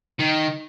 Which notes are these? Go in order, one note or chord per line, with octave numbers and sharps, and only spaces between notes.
D#3